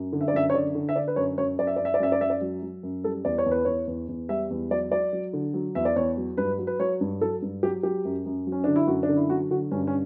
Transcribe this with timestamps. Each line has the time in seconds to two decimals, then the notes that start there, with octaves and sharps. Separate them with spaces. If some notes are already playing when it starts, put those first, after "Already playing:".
Already playing: F#2
0.12 D3
0.21 E5
0.28 D5
0.33 F#2 E5
0.50 C#5
0.54 D3 D5
0.75 D3
0.89 E5
0.95 D3 D5
1.08 B4
1.16 F#2 C#5
1.38 F#2 C#5
1.59 F#2 D5
1.67 E5
1.76 F#2 D5
1.85 E5
1.94 D5
2.00 F#2 E5
2.12 D5
2.21 F#2 E5
2.30 D5
2.41 F#3
2.62 F#3
2.83 F#2
3.04 G3 A4
3.25 E2 D5
3.38 C#5
3.46 E2
3.51 B4
3.65 E2 C#5
3.87 E2
4.08 E2
4.29 G3 E5
4.50 E2
4.71 F#3 D5
4.92 F#3 D5
5.13 F#3
5.33 D3
5.54 F#3
5.75 E2 E5
5.85 D5
5.96 E2 C#5
6.17 F#3
6.37 G2 B4
6.59 F#3
6.67 B4
6.79 F#3 C#5
7.01 G2
7.21 F#3 A4
7.42 G2
7.63 F#3 G4
7.83 F#3 G4
8.05 F#2
8.26 F#2
8.47 F#3
8.52 C#4
8.64 D3 D4
8.76 E4
8.87 F#2 F#4
9.03 D4
9.09 D3
9.16 E4
9.30 F#3 F#4
9.50 D3 F#4
9.71 G2 C#4
9.87 C#4